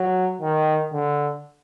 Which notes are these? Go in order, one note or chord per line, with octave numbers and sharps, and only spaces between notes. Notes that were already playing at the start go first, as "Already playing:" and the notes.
Already playing: F#3
D#3
D3